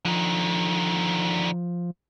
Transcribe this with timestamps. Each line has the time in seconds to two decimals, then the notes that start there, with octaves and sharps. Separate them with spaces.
0.05 D3 D#3 F3